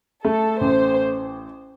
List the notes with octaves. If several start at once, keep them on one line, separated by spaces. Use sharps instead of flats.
A3 A4
A1 C5